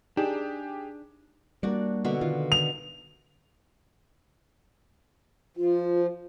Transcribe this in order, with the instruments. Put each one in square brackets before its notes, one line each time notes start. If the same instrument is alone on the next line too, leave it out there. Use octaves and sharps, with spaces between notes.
[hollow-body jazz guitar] D4 [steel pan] D#4 [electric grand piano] G4 G#4 E7
[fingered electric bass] G3 G#3 A#3 [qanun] D4 F#4 D5
[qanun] B2 D3 E5
[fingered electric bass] D3 D#3 [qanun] F4
[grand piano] F7
[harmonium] F3 [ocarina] F4